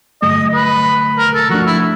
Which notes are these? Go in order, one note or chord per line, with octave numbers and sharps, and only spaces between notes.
G2 D3 F#3 A3 D#5
B4
A#4
A4
F3 A3 D4 F#4
E4